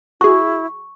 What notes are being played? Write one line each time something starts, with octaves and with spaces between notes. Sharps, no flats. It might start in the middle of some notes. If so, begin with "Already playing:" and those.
E4 F#4 G#4 C#6